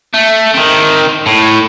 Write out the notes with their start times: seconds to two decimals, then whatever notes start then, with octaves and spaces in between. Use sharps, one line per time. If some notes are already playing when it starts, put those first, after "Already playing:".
0.14 A3
0.54 D#3 C4
1.26 A2